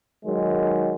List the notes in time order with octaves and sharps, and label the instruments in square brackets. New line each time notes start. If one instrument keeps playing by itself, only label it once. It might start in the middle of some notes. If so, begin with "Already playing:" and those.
[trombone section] D#3 F#3 G#3